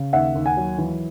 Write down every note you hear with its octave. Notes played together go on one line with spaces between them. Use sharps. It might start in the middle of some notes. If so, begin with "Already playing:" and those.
Already playing: C#3
D#2 E5 F#5
D#2
F#5 G#5
F#3
E3